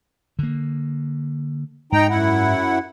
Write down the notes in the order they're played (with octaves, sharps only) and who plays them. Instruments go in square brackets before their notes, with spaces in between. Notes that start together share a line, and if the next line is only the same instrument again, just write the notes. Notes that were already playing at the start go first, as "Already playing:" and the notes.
[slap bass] D3 A#3
[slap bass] G#2 [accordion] D#4 G5 A#5
[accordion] F#2 E4 F#5